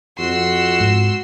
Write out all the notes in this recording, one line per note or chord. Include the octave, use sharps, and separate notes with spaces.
F2 F#4 C6 E6
G#2